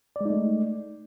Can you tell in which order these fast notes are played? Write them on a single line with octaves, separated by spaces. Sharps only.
D5 G#3 D#4 A3